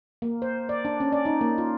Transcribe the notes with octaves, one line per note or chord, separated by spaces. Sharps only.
A#3
C5
D5
D4
C#4
D5
D#4
A#3
F4